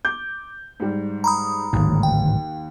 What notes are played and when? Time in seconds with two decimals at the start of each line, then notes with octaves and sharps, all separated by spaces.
0.05 D6 G6
0.80 G#2 G3
1.24 A#5 B5 D#6
1.73 D1 G#1 D#2 G#2
2.03 G5